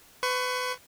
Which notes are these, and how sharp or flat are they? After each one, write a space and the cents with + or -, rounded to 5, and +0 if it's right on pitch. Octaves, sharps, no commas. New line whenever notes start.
B4 +30 C#6 +0